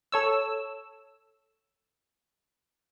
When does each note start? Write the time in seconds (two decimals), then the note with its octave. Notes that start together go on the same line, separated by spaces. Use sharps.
0.12 A4 C#5 E6